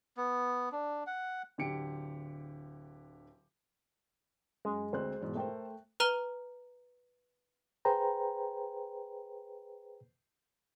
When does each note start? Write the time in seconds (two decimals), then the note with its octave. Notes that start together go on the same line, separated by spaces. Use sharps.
0.17 B3
0.72 D4
1.07 F#5
1.58 D1 D3 G4 C#7 D7
4.65 F#2 G#3
4.93 D2 C4 C5 F#6
5.21 E2 G#2 B2
5.35 A3 A4 A#4 C5 G5
6.00 B4 A#5 F6 D#7 G7
7.85 G#4 B4 C5 G5 A#5